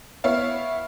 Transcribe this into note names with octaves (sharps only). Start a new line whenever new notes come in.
B3 E4 C#5 F5